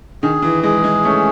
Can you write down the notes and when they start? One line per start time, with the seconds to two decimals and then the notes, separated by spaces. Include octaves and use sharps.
0.23 D#3 G#4
0.42 E3
0.63 G#3 G#4
0.84 G#3
1.05 A3 C#4